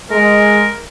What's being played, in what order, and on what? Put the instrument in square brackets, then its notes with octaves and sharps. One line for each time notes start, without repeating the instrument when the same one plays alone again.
[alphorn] G#3 [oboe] A#4